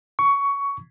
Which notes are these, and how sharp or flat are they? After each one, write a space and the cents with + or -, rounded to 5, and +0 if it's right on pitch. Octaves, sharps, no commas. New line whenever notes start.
C#6 +15